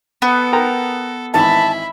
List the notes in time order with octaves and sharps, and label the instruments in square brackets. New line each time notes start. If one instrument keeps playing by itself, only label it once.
[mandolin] B3 [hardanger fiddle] A4
[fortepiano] A#4 G5 A#5
[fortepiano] G#1 E3 E5 [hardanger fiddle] E4 B5 [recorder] A5